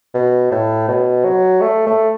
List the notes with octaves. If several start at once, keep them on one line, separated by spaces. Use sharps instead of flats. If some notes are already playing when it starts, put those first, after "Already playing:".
B2
A2
B2
F#3
A3
A3